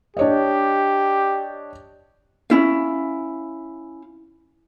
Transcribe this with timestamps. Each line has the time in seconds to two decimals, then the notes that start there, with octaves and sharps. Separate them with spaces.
0.17 D4 G4 C#5 D#5
2.50 C#4 E4 F5